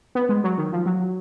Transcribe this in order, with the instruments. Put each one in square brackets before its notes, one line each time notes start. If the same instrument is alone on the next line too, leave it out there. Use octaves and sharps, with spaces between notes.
[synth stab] B3
G#3
F#3
D#3
F3
F#3